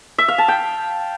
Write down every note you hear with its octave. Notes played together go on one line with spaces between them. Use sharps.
E5
F5
A5
G5